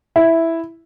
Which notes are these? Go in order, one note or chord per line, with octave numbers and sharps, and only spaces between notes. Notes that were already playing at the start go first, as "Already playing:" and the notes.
E4